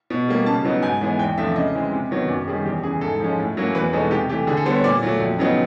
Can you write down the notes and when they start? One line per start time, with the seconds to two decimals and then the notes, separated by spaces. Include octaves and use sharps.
0.10 B2
0.28 G3 A#3
0.46 C#3 A5
0.65 F#3 B3 D#4
0.82 G#2 G#5
1.01 E3 G#3 B3
1.19 E2 G5
1.38 C3 F3 A3 D4 E5
1.56 C#3 D#5
1.74 E3 G#3 C4
1.93 C3
2.11 D#3 F#3 B3
2.28 F#2 D5
2.47 D#3 G3 G#4
2.65 E2 G4
2.83 C#3 E3 G#4
3.01 G#2 A4
3.20 F3 G#3 C#4
3.39 A2
3.57 F#3 A#3 C#4
3.75 E2 B4
3.93 B2 G#3 B3 D#4 A4
4.11 C3 G4
4.29 E3 A3 G4
4.47 D3 G#4
4.57 A4
4.66 G3 B3 C5
4.75 C#5
4.84 A#2 D5
5.03 F#3 A3
5.20 F2
5.38 C#3 F#3 B3 D#4